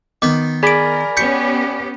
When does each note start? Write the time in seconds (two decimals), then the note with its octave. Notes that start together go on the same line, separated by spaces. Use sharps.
0.22 D#3 B3 D6
0.63 G#4 A#4 D5 G#5 B5 D7
1.17 B3 C#4 G4 C#6 G6 B6 C#7